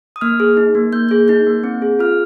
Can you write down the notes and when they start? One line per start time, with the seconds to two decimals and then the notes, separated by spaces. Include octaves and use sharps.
0.16 D#6
0.21 A#3 F6
0.40 G#4
0.57 D#4
0.75 A#3
0.92 A#3 G6
1.09 G#4 G6
1.28 D#4 G6
1.46 A#3
1.64 C4
1.82 G#4
1.99 F4 F6